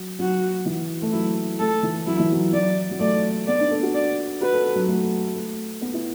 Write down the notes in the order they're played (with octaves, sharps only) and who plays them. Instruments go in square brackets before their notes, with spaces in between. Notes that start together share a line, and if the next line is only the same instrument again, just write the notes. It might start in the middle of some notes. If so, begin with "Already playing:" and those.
Already playing: [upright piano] F#3
[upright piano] F#3 [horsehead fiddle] F#4
[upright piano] E3
A3
[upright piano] F#3 [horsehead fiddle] E4
[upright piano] A3 [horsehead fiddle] A4
[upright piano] E3
[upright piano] F#3 [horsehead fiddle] E4
[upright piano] E3
F#3
[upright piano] F#3 [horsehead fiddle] D5
[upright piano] F#3
[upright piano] A3 [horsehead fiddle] D5
[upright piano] B3 [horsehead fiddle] D5
[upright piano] D4
A4
F#4
[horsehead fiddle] D5
[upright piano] F#4 [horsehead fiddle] B4
[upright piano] A4
A4
F#3
A3
A3
B3
E4